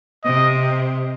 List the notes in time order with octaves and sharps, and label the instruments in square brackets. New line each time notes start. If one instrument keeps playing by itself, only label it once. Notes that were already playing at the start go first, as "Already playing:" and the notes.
[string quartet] C3 [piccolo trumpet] D#5